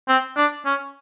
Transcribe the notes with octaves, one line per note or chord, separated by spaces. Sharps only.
C4
D4
C#4